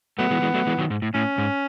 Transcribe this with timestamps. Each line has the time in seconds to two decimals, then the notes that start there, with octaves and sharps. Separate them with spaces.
0.19 F#3 A3 B3
0.31 E3 G#3
0.42 E3 G#3
0.54 F#3 A3
0.67 E3 G#3
0.79 D#3 F#3
0.90 G#2
1.02 A2
1.14 A2 C#4
1.38 G#2